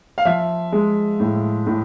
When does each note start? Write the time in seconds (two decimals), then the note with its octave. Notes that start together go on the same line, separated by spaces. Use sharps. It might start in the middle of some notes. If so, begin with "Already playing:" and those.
0.18 F5
0.25 F3 E5
0.72 G#3
1.20 A2
1.67 A2